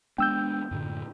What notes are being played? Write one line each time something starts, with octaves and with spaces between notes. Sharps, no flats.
G#3 B3 D4 G5 E6 G6
F#2 A2 D3